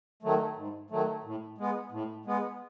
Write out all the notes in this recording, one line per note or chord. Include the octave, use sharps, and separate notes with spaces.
D#3 F#3 A3
G#2
D#3 F#3 A3
A2
G#3 B3
A2
G#3 B3